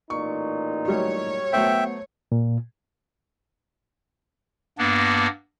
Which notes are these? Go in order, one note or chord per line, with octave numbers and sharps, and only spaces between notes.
A1 A#2 D#4 C#6
F#3 G3 A3 C#5
F#3 A3 B3 C5 E5 G5
A#2
G2 A#3 B3 D4